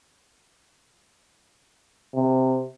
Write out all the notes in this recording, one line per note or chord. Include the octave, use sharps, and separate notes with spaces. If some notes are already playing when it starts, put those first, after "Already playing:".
C3